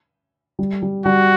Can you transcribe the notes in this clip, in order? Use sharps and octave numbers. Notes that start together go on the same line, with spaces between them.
G3
G3
G3 F#4